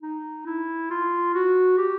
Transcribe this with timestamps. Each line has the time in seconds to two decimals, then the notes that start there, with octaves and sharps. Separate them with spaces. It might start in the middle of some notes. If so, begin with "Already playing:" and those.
0.02 D#4
0.46 E4
0.90 F4
1.34 F#4
1.78 G4